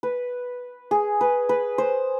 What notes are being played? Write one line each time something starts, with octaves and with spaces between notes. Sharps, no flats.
B4
G#4
B4
B4
C5